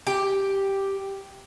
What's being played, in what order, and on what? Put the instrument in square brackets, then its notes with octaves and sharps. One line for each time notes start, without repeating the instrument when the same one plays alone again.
[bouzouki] G4